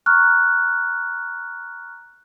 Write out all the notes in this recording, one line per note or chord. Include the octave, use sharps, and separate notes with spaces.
A#5 C#6 F6 F#6